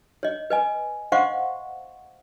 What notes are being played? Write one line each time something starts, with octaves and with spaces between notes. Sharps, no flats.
C#5 D#5
B4 D#5 G#5
C5 D#5 F5 F#5 C6 C#6